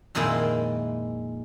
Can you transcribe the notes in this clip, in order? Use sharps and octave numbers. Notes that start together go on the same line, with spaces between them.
F2 A#2 D#3 G#3 A#3 E4